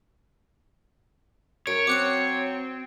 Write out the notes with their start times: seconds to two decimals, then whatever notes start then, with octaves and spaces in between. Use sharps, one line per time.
1.67 F#2 C#5 D7
1.87 F#3 C4 D6 F#6 C#7